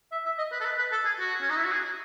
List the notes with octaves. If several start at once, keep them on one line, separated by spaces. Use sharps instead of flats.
E5
E5
D#5
B4
A4
B4
B4
A4
G#4
F#4
C#4
D#4
E4
F#4
G#4